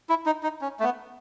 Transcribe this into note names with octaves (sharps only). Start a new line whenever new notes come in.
E4
D#4
D#4
C#4
A3
B3